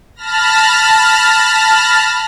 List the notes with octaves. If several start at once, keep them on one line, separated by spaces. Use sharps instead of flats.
A5 B5 F6 A#6